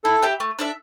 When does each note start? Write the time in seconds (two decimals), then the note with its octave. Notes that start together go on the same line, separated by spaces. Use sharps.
0.04 E4 A4
0.23 G4 E5 G5
0.40 A3
0.59 D4 A4 E5